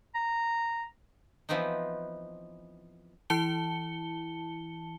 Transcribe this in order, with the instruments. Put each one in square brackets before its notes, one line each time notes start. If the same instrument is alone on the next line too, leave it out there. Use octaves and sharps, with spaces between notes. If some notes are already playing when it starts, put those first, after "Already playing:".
[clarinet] A#5
[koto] E3 F3 B3 C4 D#4
[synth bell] E3 E4 A5 C#7 G7